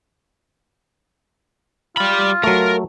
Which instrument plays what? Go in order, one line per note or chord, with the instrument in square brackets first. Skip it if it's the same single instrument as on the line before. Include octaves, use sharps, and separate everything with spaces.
[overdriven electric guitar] G3 B5 [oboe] F4
[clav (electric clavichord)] F#3 A3 [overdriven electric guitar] A#4